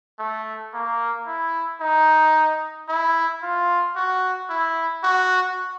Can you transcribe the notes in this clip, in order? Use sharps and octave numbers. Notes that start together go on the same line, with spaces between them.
A3
A#3
E4
D#4
E4
F4
F#4
E4
F#4